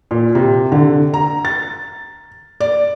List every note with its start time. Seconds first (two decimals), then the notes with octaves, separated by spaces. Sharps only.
0.11 A#2
0.35 C3
0.72 D3
1.14 A#5
1.45 A6
2.60 D5